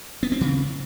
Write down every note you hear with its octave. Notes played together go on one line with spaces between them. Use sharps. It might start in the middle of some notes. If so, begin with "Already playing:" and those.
B3
C4
C#3